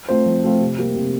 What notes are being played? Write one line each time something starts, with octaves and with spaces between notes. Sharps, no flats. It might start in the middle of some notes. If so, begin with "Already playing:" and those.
A3 C4 F4 C5
F3
A3 C4 F4 C5
C3
G3 A#3
C3